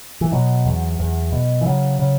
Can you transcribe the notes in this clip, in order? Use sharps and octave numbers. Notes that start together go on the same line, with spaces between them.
E3
B2 F#3
E2
E2
B2
E3
C#3 F#3
C#3